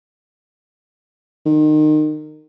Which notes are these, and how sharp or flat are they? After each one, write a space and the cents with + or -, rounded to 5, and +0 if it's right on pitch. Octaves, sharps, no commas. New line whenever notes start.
D#3 -25